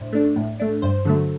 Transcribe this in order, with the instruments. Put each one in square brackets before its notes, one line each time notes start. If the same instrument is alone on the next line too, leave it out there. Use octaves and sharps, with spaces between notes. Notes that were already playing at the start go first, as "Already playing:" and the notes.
Already playing: [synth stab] A2 D4 C5
A3 D4
A2
A3 D4
G2 C5
D3 F#3 A3